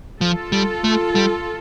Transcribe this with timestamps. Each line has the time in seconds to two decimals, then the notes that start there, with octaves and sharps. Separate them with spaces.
0.21 F3 F4 A4
0.52 G3
0.84 A3
1.15 G3